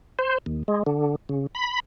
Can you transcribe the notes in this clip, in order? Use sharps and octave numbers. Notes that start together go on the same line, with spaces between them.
C5
D#2
G#3
D3
C#3
B5